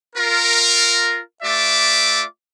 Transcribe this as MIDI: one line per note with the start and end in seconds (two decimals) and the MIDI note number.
0.16 1.20 65
0.16 1.20 70
1.43 2.24 57
1.43 2.24 65
1.43 2.24 74
1.43 2.24 76
1.43 2.24 86